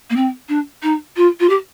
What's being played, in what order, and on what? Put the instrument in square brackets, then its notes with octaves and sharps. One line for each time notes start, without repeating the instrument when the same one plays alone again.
[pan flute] A#3
C4
D4
D#4
F4
F4
G4